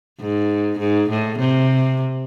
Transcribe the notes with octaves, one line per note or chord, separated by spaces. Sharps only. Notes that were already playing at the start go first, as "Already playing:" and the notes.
G#2
G#2
A2
C3